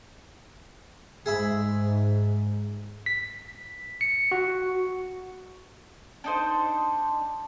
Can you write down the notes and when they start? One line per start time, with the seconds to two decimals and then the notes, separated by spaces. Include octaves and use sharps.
1.26 G#2 G#4 E5 B5
3.06 B6
4.01 C#7
4.32 F#4
6.24 D4 D#4 C5